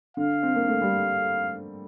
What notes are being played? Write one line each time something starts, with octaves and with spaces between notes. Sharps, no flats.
D3 F5
C4
A#3
A3
G3